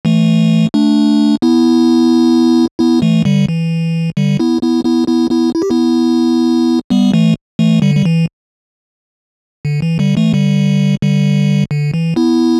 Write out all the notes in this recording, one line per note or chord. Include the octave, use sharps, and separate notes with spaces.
E3 A3
A3 D4
B3 E4
B3 E4
E3 A3
D3 G3
E3
D3 G3
B3 E4
B3 E4
B3 E4
B3 E4
B3 E4
E4
G4
B3 E4
G3 B3
E3 A3
E3 A3
D3 G3
G3
E3
D3
E3
D3 G3
E3 A3
D3 G3
D3 G3
D3
E3
B3 E4